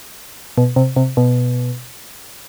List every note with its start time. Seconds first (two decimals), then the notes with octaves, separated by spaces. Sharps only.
0.58 B2
0.76 C3
0.96 C3
1.17 B2